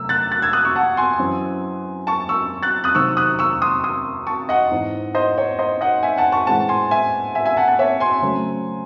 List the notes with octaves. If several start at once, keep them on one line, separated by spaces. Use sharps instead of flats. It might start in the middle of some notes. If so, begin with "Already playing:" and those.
Already playing: C3 F#3 A3 E6
F#6 A6
F#6 A6
E6 G#6
D#6 F#6
C#6 E6
F#5 A5
G#5 C6
F#2 E3 C4
A5 C#6
C#6 E6
F#6 A6
D#6 F#6
C3 D#3 F#3 C4 C#6 E6
D#6 F#6
C#6 E6
C6 D#6
C6 D#6
A5 C#6
D#5 F#5
G#2 E3 C4
C5 D#5
C#5
C5 D#5
D#5 F#5
E5 G#5
F#5 A5
A5 C#6
A2 E3 G#3 C4 F#5 A5
G#5 C6
E5 G#5
E5 G#5
E5 G#5
F#5 A5
F#5 A5
C#5 E5
G#5 C6
C#3 F#3 A3 C4